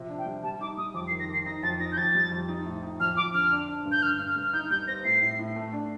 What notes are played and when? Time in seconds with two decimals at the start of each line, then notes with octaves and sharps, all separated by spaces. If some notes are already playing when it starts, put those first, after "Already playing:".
Already playing: C3 F3
0.09 D4
0.18 G5
0.26 G3
0.43 G3 A5
0.61 D#4 D6
0.78 G3 D#6
0.94 F2 D6
1.07 C7
1.11 D#3
1.20 A#6
1.29 D#3 C7
1.46 D#4 A#6
1.63 F2 A6
1.80 D#4 A#6
1.92 G6
1.97 F2 A6
2.15 G3
2.31 F2
2.49 D#4
2.66 A2
2.83 D#4
3.00 F2 F6
3.17 F2 D6
3.34 D3 F6
3.51 D4
3.68 D4
3.85 G2
3.92 G6
4.02 D3 F6
4.19 G2
4.28 F6
4.36 G2
4.42 F6
4.53 D#4 G6
4.71 G3 G6
4.87 C4 A#6
5.05 A2 C7
5.22 A2
5.39 A2
5.56 A3
5.73 D4